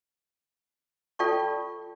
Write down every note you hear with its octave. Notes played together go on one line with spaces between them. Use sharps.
F4 A4 D5 G5 A5 C#6